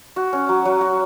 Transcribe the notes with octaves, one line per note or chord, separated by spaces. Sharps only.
F#4
C#4
F#3
F#3
F#4